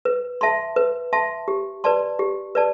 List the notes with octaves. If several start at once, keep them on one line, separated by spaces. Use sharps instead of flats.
B4
E5 A5 C6
B4
E5 A5 C6
G4
B4 D5 A5 C6
G4
B4 D5 A5